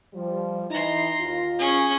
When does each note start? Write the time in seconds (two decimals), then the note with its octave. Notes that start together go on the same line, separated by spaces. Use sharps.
0.13 F3 G3
0.70 E3 D#4 E4 A#5 C6
1.20 D#2 F4
1.58 C#4 G#4